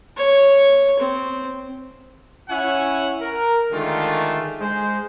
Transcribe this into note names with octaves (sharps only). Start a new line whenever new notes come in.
C#5
C4
C#4 E4 C#5 E5 F#5 G#5
A#4
D3 D#3 G#3 A3 F4
G#3 C5